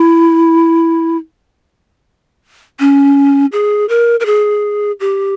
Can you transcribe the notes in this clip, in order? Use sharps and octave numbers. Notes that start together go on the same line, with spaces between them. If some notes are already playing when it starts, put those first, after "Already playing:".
Already playing: E4
C#4
G#4
A#4
A#4
G#4
G4